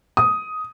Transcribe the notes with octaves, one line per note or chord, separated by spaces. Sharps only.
D#6